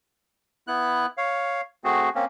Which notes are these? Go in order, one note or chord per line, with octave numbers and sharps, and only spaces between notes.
B3 E4 F#6
C#5 F5
A3 C4 F#4 G#4
A#3 C4 C#4